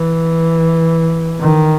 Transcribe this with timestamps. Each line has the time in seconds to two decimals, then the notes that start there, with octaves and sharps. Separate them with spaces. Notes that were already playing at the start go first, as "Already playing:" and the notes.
Already playing: E3
1.40 D#3